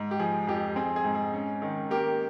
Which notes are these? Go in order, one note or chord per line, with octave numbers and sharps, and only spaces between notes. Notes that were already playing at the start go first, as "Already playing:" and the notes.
Already playing: G#2
G4
F3 G#4
F2 G4
C4 G#4
G#4
G#2
G#4
C#4
D#3
A#3 G4 A#4